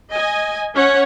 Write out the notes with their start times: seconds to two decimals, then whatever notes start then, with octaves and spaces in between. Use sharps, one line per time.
0.12 D#5 G#5
0.75 C#4 C#5 F#5